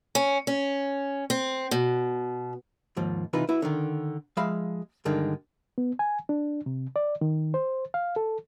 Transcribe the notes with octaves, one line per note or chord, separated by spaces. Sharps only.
C#4
C#4
C4
B2
D#2 G#2 F3
C3 E3 D#4 F4 B4
E4 F#4 B4
D3 D#3
F3 G#3 E5 F5 B5
G2 D3 D#3 G#3
B3
G#5
D4
C3
D5
D#3
C5
F5
A4